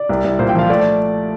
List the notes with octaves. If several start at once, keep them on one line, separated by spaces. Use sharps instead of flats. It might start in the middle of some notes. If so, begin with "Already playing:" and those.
Already playing: D5
C2
C2
A#2 C5
G5
F3 F5
A3 D5